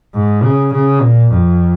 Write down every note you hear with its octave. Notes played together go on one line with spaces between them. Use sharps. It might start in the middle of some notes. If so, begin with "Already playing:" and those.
G#2
C#3
C#3
A#2
F2